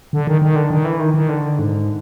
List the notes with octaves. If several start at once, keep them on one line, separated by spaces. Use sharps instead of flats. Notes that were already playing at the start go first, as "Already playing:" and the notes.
D3
D#3
D#3
D3
D#3
E3
D#3
D#3
D3
G#2